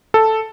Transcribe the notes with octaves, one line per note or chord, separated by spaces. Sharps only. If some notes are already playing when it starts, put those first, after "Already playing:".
A4